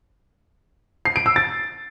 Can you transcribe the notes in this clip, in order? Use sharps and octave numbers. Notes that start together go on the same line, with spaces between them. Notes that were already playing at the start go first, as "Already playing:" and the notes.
C7
D7
E6
A6